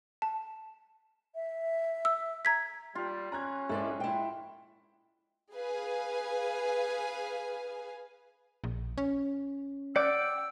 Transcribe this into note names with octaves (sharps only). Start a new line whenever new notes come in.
A5
E5
E6
A#5 G#6 B6
G3 F4
C#4 A#5 F#6 G#6
A#1 G#2 E4 A4 D5
E4 G5
G#4 B4 F5 G#5
A#1
C#4
D5 F#5 G5 D6 E6